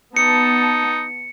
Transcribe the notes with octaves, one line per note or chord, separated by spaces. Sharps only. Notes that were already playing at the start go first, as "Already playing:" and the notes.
B3 D#4 A5 C#7